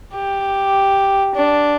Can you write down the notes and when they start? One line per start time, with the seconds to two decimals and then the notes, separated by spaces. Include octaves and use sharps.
0.15 G4
1.35 D4